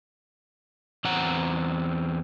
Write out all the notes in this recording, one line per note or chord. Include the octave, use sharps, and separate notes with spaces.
E2 C4 F#5 A#5